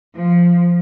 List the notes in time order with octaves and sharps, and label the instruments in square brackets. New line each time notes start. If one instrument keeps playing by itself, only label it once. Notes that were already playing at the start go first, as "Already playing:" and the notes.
[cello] F3